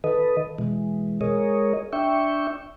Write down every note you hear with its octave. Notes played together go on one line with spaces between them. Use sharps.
D#3 A4 B4 D#5
B2 E3 G#3
G#3 G#4 A#4 C#5 D#5
D4 E5 G5 C#6